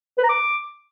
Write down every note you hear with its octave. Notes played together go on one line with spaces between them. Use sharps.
B4
A#5
D6